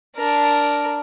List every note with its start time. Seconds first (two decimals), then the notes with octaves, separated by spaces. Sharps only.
0.16 D4 A#4